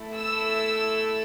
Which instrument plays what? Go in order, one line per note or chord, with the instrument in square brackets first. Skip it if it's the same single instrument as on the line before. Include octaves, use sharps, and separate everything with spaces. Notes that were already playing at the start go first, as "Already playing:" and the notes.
Already playing: [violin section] A3 E4 A4
E6